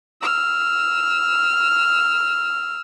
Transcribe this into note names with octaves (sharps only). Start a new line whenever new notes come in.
E6 F6